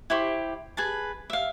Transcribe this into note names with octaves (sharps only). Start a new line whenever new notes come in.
E4 G4 C5 C#6
G#4 B4 A5
E5 F5